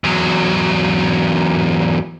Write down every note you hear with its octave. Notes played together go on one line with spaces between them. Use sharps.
E2 F#3